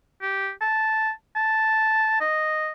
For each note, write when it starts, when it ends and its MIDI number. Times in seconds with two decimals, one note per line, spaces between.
0.22 0.50 67
0.60 1.11 81
1.36 2.19 81
2.20 2.72 75